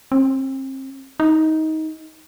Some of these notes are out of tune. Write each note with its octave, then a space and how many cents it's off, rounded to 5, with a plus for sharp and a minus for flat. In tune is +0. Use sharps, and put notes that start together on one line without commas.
C4 +35
D#4 +20